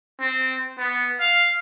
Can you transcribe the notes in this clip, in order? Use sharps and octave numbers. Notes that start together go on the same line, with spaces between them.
C4
B3
F5